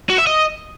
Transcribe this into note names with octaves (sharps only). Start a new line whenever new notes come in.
F#4
E5
D#5